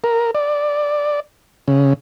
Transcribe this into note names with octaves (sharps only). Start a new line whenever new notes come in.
A#4
D5
C#3